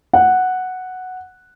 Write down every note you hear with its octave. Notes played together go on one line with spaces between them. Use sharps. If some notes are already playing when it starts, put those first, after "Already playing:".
F#5